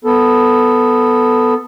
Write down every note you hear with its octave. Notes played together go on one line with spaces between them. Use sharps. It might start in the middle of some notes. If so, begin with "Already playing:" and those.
B3 A4